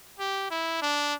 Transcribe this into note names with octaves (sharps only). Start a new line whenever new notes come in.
G4
E4
D4